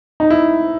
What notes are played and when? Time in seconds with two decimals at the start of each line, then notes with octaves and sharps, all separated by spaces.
0.20 D#4
0.30 E4